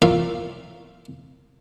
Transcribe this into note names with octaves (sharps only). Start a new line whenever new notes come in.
F4 A#4 C#5 D5 E5 F5